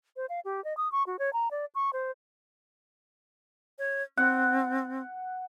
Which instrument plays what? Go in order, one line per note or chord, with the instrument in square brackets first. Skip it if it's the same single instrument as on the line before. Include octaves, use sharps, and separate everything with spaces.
[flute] C5
F5
G4
D#5
D#6
C#6
F#4
C#5
A#5
D5
C#6
C5
[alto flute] C#5
[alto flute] C4 [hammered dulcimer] F#5